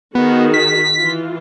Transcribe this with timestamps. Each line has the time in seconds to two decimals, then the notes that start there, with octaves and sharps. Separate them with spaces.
0.15 D#3 B3 F#4 G#4
0.54 B6
0.97 E3 F4